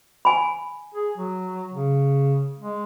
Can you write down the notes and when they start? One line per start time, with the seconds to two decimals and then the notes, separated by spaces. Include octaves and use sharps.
0.25 G#5 B5
0.94 G#4
1.17 F#3
1.73 C#3
2.59 G#3